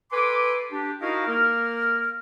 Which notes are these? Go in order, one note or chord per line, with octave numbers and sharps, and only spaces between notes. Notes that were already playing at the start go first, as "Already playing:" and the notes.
A4 B4 G#5 C6 D6
D4 G4
D#4 E4 F#4 A#4 D#5 F5
A#3 A#4 F6